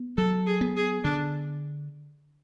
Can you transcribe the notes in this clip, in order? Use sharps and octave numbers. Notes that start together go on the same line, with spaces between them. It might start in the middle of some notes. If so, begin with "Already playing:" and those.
Already playing: B3
F#3 A4
G#4
B3
G#4
D3 D4